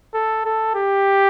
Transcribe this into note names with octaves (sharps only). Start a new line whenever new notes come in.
A4
A4
G4